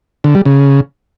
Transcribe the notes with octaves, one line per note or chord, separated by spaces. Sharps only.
D3
G3
C#3